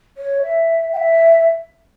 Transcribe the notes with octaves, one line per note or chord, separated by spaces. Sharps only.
C#5
E5
G5
E5